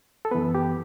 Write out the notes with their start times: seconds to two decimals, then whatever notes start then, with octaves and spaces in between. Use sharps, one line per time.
0.25 A4
0.31 F#2 E3 B3 B4
0.55 G4